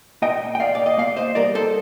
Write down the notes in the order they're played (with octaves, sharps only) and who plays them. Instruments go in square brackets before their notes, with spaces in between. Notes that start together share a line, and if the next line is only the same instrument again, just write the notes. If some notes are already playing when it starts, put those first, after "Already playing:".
[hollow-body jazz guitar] A#2 D#5 G5
G5
A#2 D5 F5
D5
D#5
A#3 D5 F5
C5 D#5
G3 A#4 D5
A4 C5